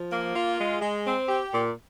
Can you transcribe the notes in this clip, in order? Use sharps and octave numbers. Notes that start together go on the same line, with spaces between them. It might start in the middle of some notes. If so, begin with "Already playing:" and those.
Already playing: F3
A#3
F4
G#3
G#3
C4
G4
A#2